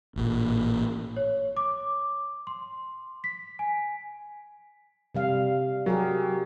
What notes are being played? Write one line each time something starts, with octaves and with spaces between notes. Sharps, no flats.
A1 A#2
C#5
D6
C6
B6
G#5
C3 G3 F5
F#3 G4 G#4 A#4